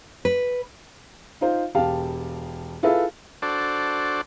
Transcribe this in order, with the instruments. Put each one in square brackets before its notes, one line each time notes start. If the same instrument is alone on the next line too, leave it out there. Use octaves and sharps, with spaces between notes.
[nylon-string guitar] B4
[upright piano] D#4 F4 C5
E1 G4 F5 A5
E4 F4 G#4 A4 B4 E5
[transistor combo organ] D4 F#4 A4 C5 D5